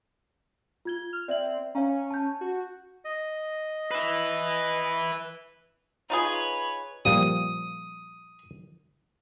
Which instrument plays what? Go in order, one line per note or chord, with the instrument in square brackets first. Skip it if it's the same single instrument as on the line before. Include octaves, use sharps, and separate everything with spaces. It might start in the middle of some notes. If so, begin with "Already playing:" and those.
[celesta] F4 G#6 G7
[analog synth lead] F6
[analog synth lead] C4 [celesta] D5 E5 F#7
[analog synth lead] C#4 [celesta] C#5 F5 A#5
[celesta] A5 G6
[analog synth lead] F#4
[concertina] D#5
[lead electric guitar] B4 E5
[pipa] D#4 F4 G#4 [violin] B4 C#5
[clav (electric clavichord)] A#2 F3 G3 [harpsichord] D#6